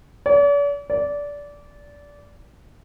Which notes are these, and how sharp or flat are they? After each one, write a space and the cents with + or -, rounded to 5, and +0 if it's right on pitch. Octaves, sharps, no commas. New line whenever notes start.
D5 -45
D5 -20